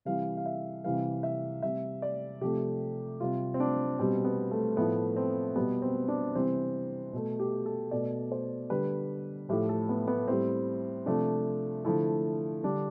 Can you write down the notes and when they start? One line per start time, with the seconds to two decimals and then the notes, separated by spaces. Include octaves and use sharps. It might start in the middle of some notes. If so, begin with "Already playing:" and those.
0.05 C3 E3 G3 F5
0.37 F5
0.46 E5
0.84 C3 E3 G3 F5
1.23 E5
1.62 C3 G3 E5
2.02 D5
2.41 C3 F3 A3 G4
3.20 C3 G3 F4
3.54 C4
3.60 D4
3.99 B2 G3 C4
4.25 B3
4.51 A3
4.77 A2 F3 A3 B3
5.16 C4
5.56 B2 G3 B3
5.82 C4
6.08 D4
6.35 C3 E3 G3 C4
7.13 B2 A3
7.39 G4
7.66 A4
7.91 B2 A3 D5
8.32 C5
8.70 D3 G3 B4
9.49 A2 F3 A3 G4
9.69 A4
9.89 B3
10.08 B3
10.28 A2 G3 C4
11.06 C3 F3 A3 D4
11.84 D3 F3 A3 E4
12.63 D3 G3 D4